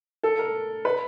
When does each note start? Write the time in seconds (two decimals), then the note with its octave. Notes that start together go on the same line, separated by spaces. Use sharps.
0.23 A4
0.39 A#4
0.85 B4